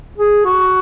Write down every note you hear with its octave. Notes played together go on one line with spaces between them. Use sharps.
G#4
F#4